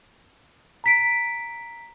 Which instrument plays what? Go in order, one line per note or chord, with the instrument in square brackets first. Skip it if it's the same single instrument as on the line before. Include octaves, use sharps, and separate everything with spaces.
[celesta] A#5 B6 D7